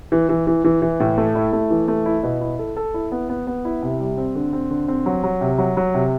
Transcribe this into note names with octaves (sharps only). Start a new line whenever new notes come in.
E3
E3
E3
E3
E3
A2
A3
E4
A3
E3
A3
E4
B2
E4
A4
A4
E4
B3
B3
B3
E4
C3
G3
C4
D3
C4
D3
C4
F#3
F#3
C3
F#3
F#3
C3